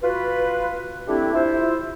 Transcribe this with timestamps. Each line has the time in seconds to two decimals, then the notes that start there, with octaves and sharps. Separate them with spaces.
0.03 F4 F#4 B4
1.08 G3 A3 C4 D4 E4 G4
1.34 E4 F4 C5 E5